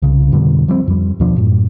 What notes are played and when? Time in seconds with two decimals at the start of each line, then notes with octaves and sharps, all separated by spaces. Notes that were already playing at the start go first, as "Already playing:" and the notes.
0.02 C2 C#3
0.32 F2 B2 D3 G3
0.68 F3 G3 A#3 C4
0.88 F2 G3
1.20 D#2 B2 F3 D4
1.38 F#2 A2